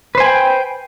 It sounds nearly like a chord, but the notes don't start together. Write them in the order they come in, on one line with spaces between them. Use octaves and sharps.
B4 C5 G#5 B5 G5